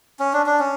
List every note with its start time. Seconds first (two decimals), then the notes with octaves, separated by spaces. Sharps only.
0.19 C#4
0.33 D4
0.46 D4
0.59 C#4